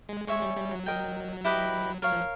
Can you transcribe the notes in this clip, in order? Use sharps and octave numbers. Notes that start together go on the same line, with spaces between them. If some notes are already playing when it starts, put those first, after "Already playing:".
G#3
G#3 C#5 E5 G#5 C#6
G3
G3
F#3
A#4 D#5 G5
E4 G4 B4 D#5
F#3 A#4 C#5 F5
F3